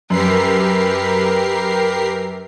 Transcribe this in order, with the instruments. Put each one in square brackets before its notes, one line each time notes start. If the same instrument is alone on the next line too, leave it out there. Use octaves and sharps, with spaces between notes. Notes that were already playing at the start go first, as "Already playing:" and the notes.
[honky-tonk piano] F#2 [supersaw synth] G4 A#4 C7 [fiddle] B4